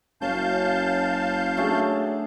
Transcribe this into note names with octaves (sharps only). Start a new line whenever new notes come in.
F#1 F#2 C#4 F5 A5 G6
F#3 A3 D4 G#4